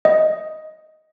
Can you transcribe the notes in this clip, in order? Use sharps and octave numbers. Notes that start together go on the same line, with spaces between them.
D#5